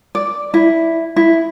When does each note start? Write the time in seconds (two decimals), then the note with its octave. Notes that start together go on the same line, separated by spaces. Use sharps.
0.15 D5
0.54 E4
1.16 E4